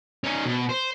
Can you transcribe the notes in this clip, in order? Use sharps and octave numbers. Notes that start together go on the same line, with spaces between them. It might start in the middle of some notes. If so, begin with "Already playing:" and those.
C#4 D#4
B2
C5